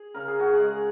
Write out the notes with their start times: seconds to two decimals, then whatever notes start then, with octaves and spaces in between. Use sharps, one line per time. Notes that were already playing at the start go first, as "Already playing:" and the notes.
Already playing: G#4
0.14 C#3 A#4
0.28 G#4
0.40 F#4
0.53 G#4
0.59 G#3